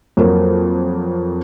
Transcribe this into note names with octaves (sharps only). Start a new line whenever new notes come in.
F2 F#3 A#3 F4